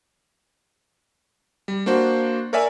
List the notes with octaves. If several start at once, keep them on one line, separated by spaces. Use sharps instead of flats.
G3
A#3 D4 F#4 C5
A#4 C#5 D5 E5 G#5